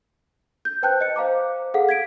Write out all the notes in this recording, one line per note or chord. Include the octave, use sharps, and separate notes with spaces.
G6
B4 C5 G5 A5 F#6 G6
D#5 C#7
C5 F5 A#5 D6
G#4 A4 F5 F#5
G#6 B6 D7